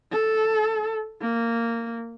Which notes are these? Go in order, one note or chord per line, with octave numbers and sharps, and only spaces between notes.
A4
A#3